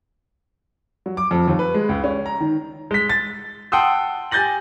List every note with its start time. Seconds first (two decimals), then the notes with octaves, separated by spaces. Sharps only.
1.06 F#3
1.17 D6
1.31 F2
1.48 D#2
1.59 B4
1.74 G#3
1.89 C#2
2.04 C#4
2.26 A#5
2.41 D#3
2.91 G#3 B6
3.09 A6
3.72 F#5 G5 A5 C6 D#6 E6
4.31 G4 G#5 G6 A6 A#6 F#7